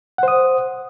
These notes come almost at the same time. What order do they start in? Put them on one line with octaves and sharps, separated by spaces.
F#5 C5 D#6